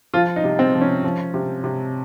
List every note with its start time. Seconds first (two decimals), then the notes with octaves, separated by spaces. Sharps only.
0.14 F3 F4
0.36 D#4
0.44 C3
0.59 C4
0.74 F3
0.81 C#4
1.04 F3
1.34 C3
1.64 C3